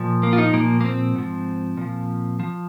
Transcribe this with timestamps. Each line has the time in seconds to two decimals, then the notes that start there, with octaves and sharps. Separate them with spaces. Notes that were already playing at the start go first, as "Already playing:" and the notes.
Already playing: A#2 F3
0.23 A#3
0.33 F4
0.38 D#4
0.53 A#2 F3 A#3
0.81 A#3
0.85 C4
1.16 G#2 F3
1.77 A#2 F3
2.40 F3